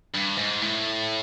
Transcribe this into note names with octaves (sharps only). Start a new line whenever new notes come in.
G2
G#2
A2